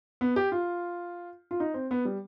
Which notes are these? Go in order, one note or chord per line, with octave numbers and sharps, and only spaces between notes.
B3
G4
F4
F4
D#4
C4
B3
G3